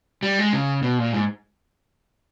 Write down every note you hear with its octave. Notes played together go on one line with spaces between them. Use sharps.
G3
G#3
C#3
B2
A#2
G#2